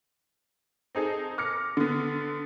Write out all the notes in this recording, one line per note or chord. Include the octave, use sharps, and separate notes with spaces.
C4 D#4 G#4 A4
D6 F6 A#6 C#7
D3 B3